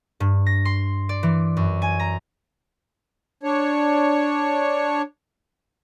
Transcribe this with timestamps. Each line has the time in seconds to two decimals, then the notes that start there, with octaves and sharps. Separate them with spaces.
0.20 G2
0.46 A#6
0.65 C6
1.09 D5
1.23 E3
1.57 F#2
1.82 G#5
2.00 A#5
3.43 D4 C#5